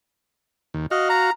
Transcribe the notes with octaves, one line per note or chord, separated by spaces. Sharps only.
D#2
F#4 D#5 F5
A#5